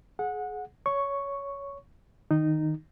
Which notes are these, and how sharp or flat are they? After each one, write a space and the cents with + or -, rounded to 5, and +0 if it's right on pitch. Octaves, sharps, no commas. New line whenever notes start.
G#4 +25 F#5 -20
C#5 +15 C#6 +0
D#3 +0 D#4 -10